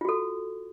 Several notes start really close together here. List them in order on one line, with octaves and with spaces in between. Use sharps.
F4 F#4 A4